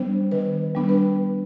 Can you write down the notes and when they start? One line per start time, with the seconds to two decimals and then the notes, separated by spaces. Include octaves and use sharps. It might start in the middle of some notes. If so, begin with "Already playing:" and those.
Already playing: G3 B3 D4 C5
0.32 D#3 B4
0.75 G3 B3 D4
0.89 B4